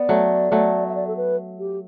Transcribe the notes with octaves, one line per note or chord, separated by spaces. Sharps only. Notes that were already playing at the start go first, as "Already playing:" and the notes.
Already playing: B3 D5
F#3 A3
F#3 A3
E5
D5
A4
B4
G4